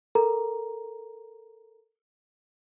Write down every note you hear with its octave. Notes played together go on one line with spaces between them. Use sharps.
A4 A#4 A#5